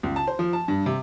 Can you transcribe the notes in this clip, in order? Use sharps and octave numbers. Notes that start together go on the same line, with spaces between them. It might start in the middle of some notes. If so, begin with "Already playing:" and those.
C#2
A5
C5
F3
A5
G2
C3